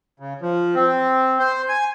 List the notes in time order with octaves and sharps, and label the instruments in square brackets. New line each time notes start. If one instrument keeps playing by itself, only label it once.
[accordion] C#3
F3
C4
C5
G#5